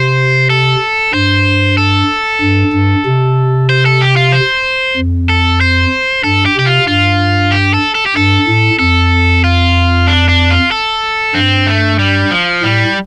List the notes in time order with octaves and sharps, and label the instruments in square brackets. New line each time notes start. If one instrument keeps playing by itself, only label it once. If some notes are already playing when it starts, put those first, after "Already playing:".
Already playing: [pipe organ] C3 [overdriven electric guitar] C5
[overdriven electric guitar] A4
[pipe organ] G2 [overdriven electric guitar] C5
[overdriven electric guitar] A4
[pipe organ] G2
G2
C3
[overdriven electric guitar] C5
A4
G4
F4
C5
[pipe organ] F2
[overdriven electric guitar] A4
C5
[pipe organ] G2 [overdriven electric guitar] A4
[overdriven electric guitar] G4
[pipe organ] C3 [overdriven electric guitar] G4
[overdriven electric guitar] F4
[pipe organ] G2 [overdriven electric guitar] F4
[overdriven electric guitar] G4
A4
A4
G4
[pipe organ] G2 [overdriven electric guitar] A4
[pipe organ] A2
[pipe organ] F2 [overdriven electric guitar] A4
[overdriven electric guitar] F4
D4
D4
F4
A4
[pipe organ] G2 [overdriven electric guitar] C4
[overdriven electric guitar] A3
G3
F3
[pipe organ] A2 [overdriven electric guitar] G3